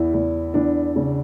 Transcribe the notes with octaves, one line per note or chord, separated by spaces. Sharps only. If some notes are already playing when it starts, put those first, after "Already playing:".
Already playing: E2 E4
E2
E2 D4
C#3